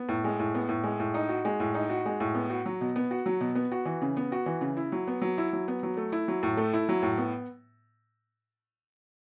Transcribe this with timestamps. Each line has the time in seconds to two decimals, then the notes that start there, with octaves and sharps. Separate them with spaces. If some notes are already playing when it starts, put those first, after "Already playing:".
Already playing: B3
0.09 A2
0.24 G#3
0.40 A2
0.55 B3
0.69 A2
0.84 G#3
1.00 A2
1.14 D#4
1.29 F#4
1.45 G#3
1.60 A2
1.74 D#4
1.90 F#4
2.06 G#3
2.20 A2
2.35 B3
2.50 F#4
2.66 F#3
2.81 B2
2.96 B3
3.11 F#4
3.26 F#3
3.41 B2
3.55 B3
3.72 F#4
3.86 E3
4.02 C#3
4.17 B3
4.32 F#4
4.46 E3
4.61 C#3
4.77 E4
4.92 F#3
5.08 B3
5.21 F#3
5.38 E4
5.53 F#3
5.68 B3
5.83 F#3
5.97 A3
6.12 E4
6.28 F#3
6.43 A2
6.57 A3
6.74 E4
6.89 F#3
7.03 A2
7.18 B3